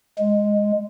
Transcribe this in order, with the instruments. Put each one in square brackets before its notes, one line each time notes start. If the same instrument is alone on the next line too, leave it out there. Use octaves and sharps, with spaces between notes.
[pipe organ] G#3